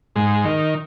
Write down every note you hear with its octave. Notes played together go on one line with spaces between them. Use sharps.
G#2
D#3